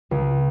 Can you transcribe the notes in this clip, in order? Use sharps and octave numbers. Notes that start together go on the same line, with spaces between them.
C#2